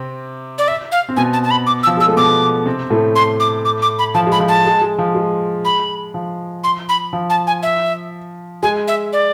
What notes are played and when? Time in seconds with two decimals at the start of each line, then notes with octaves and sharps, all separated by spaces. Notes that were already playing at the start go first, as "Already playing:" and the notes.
Already playing: C3 C4
0.58 D5
0.68 E5
0.92 F5
1.09 C4
1.16 B2 B3 G#5
1.33 A5
1.44 A5
1.51 B5
1.67 D6
1.83 E6
1.87 F3
1.97 G#3 E6
2.07 A3
2.17 B2 B3 D6
2.66 C3 C4
2.90 A2 A3
3.16 C6
3.40 D6
3.65 D6
3.82 D6
3.99 B5
4.15 F3 A5
4.27 G#3 B5
4.40 F3
4.48 A5
4.65 G#3
4.81 G#3
4.98 F3
5.15 G#3
5.65 B5
6.14 F3
6.64 C6
6.89 B5
7.13 F3
7.30 A5
7.47 G#5
7.63 E5
8.63 G#3 G#5
8.88 E5
9.13 D5